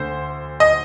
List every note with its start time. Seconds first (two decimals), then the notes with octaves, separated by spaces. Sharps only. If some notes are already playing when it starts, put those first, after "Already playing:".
Already playing: D2 D3 C5
0.60 D#5